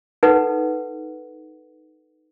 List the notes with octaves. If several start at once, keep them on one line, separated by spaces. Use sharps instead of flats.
D#4 A4 B4 F#5